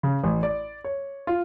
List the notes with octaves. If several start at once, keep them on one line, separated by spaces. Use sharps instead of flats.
C#3
A1
D5
C#5
F4